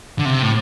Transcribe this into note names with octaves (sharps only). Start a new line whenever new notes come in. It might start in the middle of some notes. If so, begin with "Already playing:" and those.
D3
C3
A2